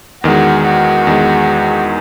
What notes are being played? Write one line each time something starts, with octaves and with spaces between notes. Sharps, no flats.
E2 D#3 G#3 F#4
F#4
E2 D#3 G#3